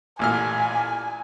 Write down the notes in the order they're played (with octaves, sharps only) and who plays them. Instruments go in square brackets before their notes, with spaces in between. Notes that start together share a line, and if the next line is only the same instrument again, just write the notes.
[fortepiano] A1 A#2 F6 [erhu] G#5